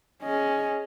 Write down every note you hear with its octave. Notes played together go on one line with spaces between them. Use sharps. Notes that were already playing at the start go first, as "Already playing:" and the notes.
C#4 G#4 D#5